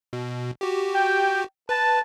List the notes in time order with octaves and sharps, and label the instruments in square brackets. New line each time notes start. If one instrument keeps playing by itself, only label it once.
[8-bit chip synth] B2
F#4 G4
[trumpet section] G5
[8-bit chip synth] B4 [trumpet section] A5